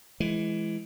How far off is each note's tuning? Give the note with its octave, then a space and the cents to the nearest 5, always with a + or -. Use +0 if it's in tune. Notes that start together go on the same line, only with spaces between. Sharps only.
E3 +15 G#3 +25